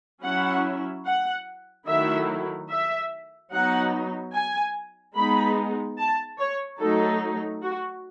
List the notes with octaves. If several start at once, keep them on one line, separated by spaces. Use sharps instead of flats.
F#3 C#4 E4 F#5
F#5
D#3 F#3 A3 E4 E5
E5
F#3 B3 D#4 F#5
G#5
G#3 B3 D#4 B5
A5
C#5
F#3 A3 D#4 A4
F#4